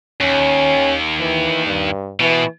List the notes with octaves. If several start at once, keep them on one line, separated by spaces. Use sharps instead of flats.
D#2 C#4
E3
G2
B2 E3